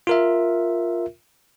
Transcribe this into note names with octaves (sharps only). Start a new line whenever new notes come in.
F4 A#4 E5